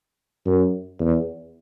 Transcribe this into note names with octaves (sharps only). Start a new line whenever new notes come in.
F#2
E2